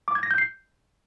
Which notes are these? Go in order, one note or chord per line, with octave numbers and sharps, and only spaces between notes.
D6
G#6
A#6
G6
C7